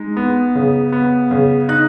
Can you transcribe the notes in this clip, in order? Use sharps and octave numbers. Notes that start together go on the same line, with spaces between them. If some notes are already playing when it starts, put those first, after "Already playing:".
Already playing: G#3 D#4
B3
C#3
B3
C#3
D#4 F#6